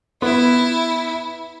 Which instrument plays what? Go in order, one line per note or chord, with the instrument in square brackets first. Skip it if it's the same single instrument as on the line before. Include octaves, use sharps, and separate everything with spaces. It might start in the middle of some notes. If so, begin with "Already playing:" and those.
[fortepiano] B3 [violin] E4